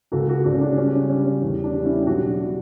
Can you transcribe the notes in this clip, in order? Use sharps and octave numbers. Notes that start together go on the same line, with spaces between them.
C#2 F#4 A4
F#4 A4
C#2 D4 F#4
C#4
D4
G3 C#4
D4
G3 C#4
C#4
E2 D4
D4
G3
C#4 E4
G4
B1 D4 F#4
G3